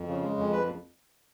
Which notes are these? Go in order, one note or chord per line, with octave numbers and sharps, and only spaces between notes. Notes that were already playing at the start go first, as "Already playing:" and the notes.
Already playing: F2
C#3
G#3
F2
B4